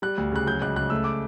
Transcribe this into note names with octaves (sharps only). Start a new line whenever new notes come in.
G3 F#6
D2
C#3 F#6
F#3 G6
C#2 F#6
C#3 F#6
A3 E6
D6